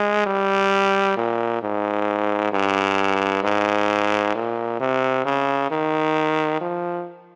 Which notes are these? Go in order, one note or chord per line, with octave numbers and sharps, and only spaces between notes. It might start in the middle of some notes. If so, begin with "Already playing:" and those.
Already playing: G#3
G3
A#2
G#2
G2
G#2
A#2
C3
C#3
D#3
F3